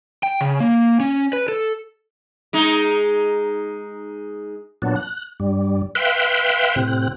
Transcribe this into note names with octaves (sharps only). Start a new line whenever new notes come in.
G5
C#3
A#3
C#4
B4
A4
G#3 D#4
A#2 F#3 B3 D4
F#6
G2 G3
B4 E5 F5 G5 C6 F#6
A2 C3 C4 F#6